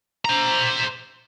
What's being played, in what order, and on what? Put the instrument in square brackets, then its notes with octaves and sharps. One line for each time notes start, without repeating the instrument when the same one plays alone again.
[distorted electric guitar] C5 A#5